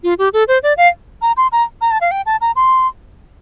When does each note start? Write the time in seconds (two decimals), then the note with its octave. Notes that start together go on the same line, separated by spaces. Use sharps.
0.04 F4
0.18 G4
0.33 A4
0.48 C5
0.63 D5
0.77 F5
1.22 A#5
1.37 C6
1.52 A#5
1.81 A#5
1.91 A5
2.01 F5
2.11 G5
2.26 A5
2.41 A#5
2.56 C6